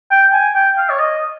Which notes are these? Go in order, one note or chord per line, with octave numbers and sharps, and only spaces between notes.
G5
G#5
G5
F5
C#5
D#5